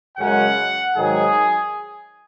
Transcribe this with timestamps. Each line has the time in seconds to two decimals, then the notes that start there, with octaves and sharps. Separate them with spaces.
0.18 F#2 C#3 G#3 C#4 F#5
0.96 G#2 D#3 F#3 G#4